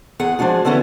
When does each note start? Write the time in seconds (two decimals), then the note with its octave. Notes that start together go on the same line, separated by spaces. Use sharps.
0.19 E2 G#4 F#5
0.39 F3 G#3 D4 F#4 G#4
0.65 D3 E3 B3 C#4 E4 F#4